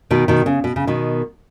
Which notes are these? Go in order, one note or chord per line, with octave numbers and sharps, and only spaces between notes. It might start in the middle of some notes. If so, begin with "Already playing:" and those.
B2 D#3
B2 D#3
C#3
B2
C#3
B2 D#3